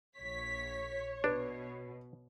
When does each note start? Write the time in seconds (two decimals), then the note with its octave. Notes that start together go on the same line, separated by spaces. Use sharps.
0.18 A#1 C#5 B6
1.24 B2 D4 B4